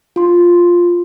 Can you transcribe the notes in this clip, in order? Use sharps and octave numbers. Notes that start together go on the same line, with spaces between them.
F4 C6